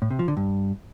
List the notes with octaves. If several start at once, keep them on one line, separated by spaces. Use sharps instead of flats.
A2
C3
F3
D3
G2